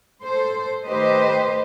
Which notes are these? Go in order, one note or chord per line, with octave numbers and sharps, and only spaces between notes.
A4 C5
D#3 A3 G4 B4 C5 D#5